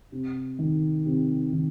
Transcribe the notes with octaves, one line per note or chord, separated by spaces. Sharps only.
C3
D#3
C3
D#3